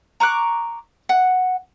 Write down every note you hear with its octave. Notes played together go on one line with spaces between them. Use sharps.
A#5 C#6 D6 F#6
F#5